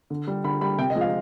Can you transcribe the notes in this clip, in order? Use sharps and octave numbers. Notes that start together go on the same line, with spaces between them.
D3
G3
D3 B5
G3 B5
C3 G5
D#5
F3 G#3
F5